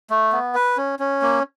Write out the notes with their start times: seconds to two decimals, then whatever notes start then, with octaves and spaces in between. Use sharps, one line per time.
0.10 A3
0.33 B3
0.55 B4
0.77 C#4
0.99 C#4
1.22 A#3